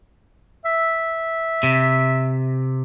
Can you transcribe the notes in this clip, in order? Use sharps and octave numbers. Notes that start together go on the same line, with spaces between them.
E5
C3